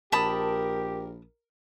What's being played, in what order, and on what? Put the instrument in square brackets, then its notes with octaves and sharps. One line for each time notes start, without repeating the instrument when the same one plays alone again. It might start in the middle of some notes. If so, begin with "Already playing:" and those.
[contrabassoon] A#1 [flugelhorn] G4 [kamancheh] A#4 [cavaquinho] A5 B5 D#6